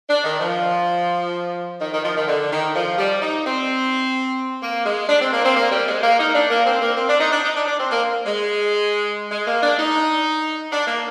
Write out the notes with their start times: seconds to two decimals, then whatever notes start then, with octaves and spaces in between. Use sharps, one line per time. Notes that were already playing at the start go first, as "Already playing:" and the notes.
0.09 D4
0.24 D#3
0.40 F3
1.81 D#3
1.92 D#3
2.04 F3
2.16 D#3
2.28 D3
2.52 D#3
2.75 F3
2.98 G3
3.22 D#4
3.46 C4
4.62 A#3
4.86 G#3
5.09 D4
5.21 C4
5.33 A#3
5.44 C4
5.56 A#3
5.71 G3
5.87 G#3
6.03 A#3
6.19 D#4
6.35 D4
6.50 A#3
6.66 C4
6.82 A#3
6.96 C4
7.09 D4
7.20 D#4
7.32 D4
7.44 D#4
7.56 D4
7.67 D4
7.80 C4
7.91 A#3
8.26 G#3
9.31 G#3
9.47 A#3
9.63 D4
9.79 D#4
10.72 D4
10.87 A#3